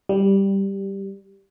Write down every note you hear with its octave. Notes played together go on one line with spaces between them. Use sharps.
G3